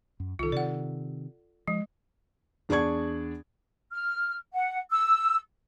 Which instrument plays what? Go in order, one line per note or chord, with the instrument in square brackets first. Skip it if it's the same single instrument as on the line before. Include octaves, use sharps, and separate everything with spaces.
[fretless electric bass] F#2
[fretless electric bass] C2 D#3 [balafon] F4 A4
[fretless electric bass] C3 D#3 [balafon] D5 F#5
[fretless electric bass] F3 [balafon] G#3
[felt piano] E2 D4 G#4 D5 C#6 G#6
[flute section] F6
F#5
E6